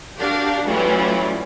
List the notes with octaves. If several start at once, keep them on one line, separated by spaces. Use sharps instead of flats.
D4 F#4 G4 A#4 D5 F5
A2 E3 F#3 G3 C#4 F4